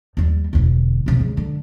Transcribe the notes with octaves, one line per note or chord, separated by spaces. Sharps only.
D#2 G3
E1 D2
C2 C3
C#3 G#3
D3